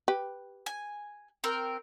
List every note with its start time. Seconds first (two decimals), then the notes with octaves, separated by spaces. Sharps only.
0.08 G4 B4
0.66 G#5
1.44 C4 A#4 G5